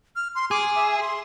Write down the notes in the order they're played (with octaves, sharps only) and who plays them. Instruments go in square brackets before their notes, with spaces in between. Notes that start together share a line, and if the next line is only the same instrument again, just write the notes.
[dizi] F6
C6
[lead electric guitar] G#4 [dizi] D6
[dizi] E5
C6